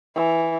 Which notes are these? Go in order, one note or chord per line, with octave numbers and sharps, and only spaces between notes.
E3